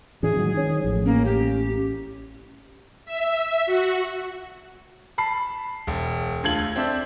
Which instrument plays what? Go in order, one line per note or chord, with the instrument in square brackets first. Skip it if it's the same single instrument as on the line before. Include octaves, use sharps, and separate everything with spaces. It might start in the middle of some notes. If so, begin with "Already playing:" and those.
[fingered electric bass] A2 E3 C#4 [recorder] G#4
[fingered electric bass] D#3 F#3 G#3
D#3 C#4
[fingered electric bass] A1 A2 [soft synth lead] F3
[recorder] A#3 [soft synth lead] C#4
[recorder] G4
[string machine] E5
F#4
[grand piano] A5 B5 C7
E1
D2 F4 A4 G#6 F#7
C4 D4 E5